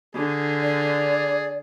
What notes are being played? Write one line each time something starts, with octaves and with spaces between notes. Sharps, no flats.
D3 G#4
D5